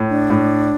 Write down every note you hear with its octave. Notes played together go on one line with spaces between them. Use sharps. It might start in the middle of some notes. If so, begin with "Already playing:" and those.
Already playing: A2
D4
A2